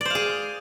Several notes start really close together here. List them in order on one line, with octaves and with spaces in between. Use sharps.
D5 C5 F5 G#4